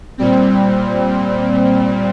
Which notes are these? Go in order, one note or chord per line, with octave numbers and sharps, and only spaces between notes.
A#2 G3 C4